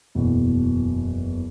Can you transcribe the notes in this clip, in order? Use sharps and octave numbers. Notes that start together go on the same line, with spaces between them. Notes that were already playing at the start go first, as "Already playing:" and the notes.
F#1 E2 B2